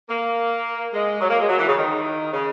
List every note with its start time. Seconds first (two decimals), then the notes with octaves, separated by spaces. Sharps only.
0.09 A#3
0.93 G#3
1.20 F#3
1.29 A#3
1.40 G#3
1.49 F#3
1.58 E3
1.67 C#3
1.77 D#3
2.32 C#3